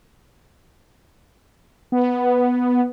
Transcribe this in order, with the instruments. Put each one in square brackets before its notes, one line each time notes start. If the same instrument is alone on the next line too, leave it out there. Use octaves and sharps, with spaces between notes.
[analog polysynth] B3